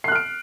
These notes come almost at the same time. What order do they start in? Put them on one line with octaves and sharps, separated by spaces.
C7 F#6 F6 D7